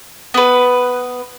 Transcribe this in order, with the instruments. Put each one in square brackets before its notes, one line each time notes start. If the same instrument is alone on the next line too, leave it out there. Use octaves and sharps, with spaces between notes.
[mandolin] B3 B4